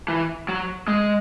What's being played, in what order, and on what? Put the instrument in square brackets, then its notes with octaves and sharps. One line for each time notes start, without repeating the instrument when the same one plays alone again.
[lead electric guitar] E3
F#3
G#3